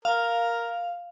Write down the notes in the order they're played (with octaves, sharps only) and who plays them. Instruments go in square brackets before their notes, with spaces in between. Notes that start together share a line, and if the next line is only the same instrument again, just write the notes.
[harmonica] A#4 [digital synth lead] F5